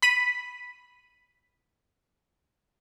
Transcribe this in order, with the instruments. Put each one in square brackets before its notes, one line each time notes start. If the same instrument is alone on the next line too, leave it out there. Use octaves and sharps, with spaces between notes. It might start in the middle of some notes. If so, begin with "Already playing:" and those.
[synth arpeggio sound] B5 B6 D#7